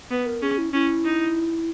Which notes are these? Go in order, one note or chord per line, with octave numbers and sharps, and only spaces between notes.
B3 B4
A#4
C#4 G#4
E4
C#4 E4
D#4